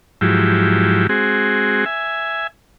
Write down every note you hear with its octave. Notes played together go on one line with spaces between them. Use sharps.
G#2 F3 F#3 E4 G4
G#3 C4 F#4 G#4
E5 G#5